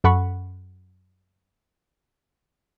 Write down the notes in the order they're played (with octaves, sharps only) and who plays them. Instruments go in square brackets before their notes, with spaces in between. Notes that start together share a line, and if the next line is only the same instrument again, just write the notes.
[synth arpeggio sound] F#2 A4 F#5 B5 C#6